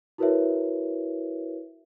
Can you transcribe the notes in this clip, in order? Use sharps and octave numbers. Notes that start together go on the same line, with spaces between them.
E4 F#4 A#4 B4 C#5 E5